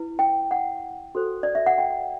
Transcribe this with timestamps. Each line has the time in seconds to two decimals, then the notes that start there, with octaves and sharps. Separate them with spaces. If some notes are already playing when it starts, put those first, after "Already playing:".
Already playing: E4 B4
0.19 G5
0.51 F#5
1.15 F#4 A4 C5
1.43 D5
1.55 E5
1.66 F#5
1.78 G5